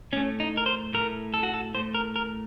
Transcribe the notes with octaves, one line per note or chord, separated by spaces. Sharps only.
A2 A3 C#4
D#4
A#4
C5
A2 A3 A#4
A4
F#4
A4
A2 A3 C5
A#4
A#4